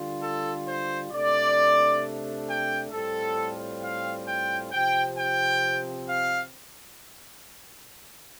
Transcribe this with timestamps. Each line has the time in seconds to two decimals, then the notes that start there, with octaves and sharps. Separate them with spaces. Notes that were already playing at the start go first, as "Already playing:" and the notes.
Already playing: D3 G3 F4
0.22 A4
0.67 C5
1.12 C3 A3 D4 D5
2.47 G5
2.92 A2 G3 C4 F4 A4
3.82 F5
4.27 G5
4.72 C3 F3 C4 G5
5.17 G5
6.07 F5